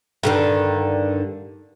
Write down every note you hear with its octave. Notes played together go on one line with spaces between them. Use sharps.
G2 D3 D#3